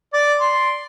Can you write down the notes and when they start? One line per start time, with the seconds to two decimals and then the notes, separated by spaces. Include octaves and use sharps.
0.13 D5
0.40 C6